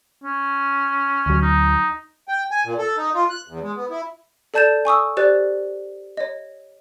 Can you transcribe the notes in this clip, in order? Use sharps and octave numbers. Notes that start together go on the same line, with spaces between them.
C#4
D2 F#3
D#4
G5
G#5
A#2
A4
D#4
F4
F#6
E2
G#3
B3
E4
A4 D5 A5 G6 A6 E7
G#5 C#6 D#6 E6
G4 C5 D5 F#6 A6
C#5 D#5